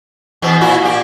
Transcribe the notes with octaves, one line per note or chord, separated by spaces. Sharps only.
E2 B2 C4
A#2 E4 F#4
A#2 G4